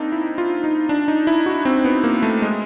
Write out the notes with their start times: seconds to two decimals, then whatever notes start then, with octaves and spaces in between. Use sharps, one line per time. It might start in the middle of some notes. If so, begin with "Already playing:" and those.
Already playing: A#3 C4 D4 D#4
0.12 E4
0.38 F4
0.64 D#4
0.89 D4
1.08 D#4
1.27 E4
1.46 F#4
1.65 C4
1.84 B3
2.04 A#3
2.23 A3
2.42 G#3